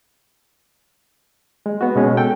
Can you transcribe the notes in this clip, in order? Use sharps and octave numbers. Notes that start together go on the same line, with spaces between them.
G#3
B3 F#4
B2 G#3 C#4
A4 G5